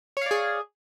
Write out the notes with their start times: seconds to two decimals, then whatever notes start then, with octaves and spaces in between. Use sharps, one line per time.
0.17 C#5
0.21 F5
0.26 D5
0.31 G#4